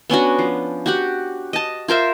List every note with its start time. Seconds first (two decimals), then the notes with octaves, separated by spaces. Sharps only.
0.10 B3 C#4 D4 F#4
0.39 F3
0.86 F#4 G4 F#5
1.53 D#5 A5
1.88 F4 A#4 C5 E5